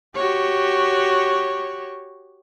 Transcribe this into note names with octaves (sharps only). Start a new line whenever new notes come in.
F#4 G4 C#5